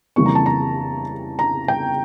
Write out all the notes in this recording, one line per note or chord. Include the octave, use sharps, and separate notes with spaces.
F2 C#3 E3 G3 A#3 C#6
A#5
A5
A#5
A#5
G5